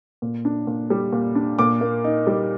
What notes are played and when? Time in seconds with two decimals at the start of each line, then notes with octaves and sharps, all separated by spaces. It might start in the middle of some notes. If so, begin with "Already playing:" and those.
0.22 A#2
0.45 D4
0.67 A#2
0.90 G3
1.13 A#2
1.35 D4
1.59 A#2 D6
1.81 A#3
2.04 D#4
2.27 G3